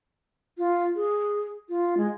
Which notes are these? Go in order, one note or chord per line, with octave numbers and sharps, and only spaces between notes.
F4
G#4
F4
G#3